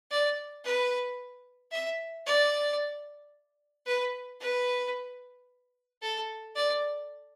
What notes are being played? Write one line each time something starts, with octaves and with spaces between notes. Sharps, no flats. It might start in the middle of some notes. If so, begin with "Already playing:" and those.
D5
B4
E5
D5
B4
B4
A4
D5